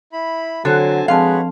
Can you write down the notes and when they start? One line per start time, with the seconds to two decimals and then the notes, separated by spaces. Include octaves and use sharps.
0.13 E4 B5
0.65 D3 F#3 C4 A4 C#5 G#5 A5
1.08 F3 G#3 C4 F#4 B4 C#5 F5 A5